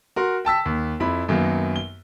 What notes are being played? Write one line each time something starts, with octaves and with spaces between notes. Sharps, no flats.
F#4 A#4 C6
G5 A5 E6 B6
D#2
F2 E4 B5
F#2 D#3 F#3 A#3 B3
G7